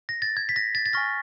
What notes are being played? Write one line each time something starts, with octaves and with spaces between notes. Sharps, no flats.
A#6
A6
G#6
B6
A#6
A6
A6
G#5 C#6 F6 A#6